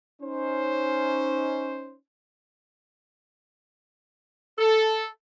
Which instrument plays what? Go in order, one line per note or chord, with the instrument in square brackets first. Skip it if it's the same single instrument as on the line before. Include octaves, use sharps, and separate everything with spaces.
[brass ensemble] C#4 D#4 C5
[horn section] A4